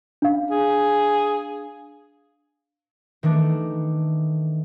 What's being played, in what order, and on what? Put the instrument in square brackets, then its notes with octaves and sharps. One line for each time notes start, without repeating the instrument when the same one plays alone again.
[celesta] D4 F5
[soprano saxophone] G#4
[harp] D#3 E3 A3 D4